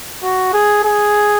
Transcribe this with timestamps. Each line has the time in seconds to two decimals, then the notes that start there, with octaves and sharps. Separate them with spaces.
0.23 F#4
0.54 G#4
0.84 G#4